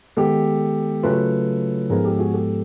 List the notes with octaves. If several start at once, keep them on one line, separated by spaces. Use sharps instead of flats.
D#3 G#3 B3 G4 A4
C#3 F#3 A3 C#4 F4 A4 B4
G#2 F3 G#3 B3 G#4 A#4
G4 A4
F#4 G#4
G4 A4